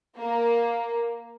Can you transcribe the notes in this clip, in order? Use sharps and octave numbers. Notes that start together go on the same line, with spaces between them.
A#3